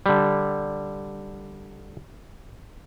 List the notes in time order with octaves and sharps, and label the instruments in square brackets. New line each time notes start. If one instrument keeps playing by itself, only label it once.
[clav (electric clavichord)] D3 G3